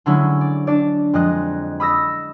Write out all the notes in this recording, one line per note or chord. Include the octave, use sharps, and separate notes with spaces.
D3 F#3 G#3 C#4 E4
D5
D4 D5
F2 G#3 D#5 F#6 D#7
B5 D#6 E6 A#6